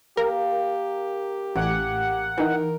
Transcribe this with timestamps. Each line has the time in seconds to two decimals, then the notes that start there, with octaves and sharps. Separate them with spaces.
0.17 A#3 G4 A#4
1.56 A1 F#5 G#5 D6
2.38 E3 D#4 A#4 G5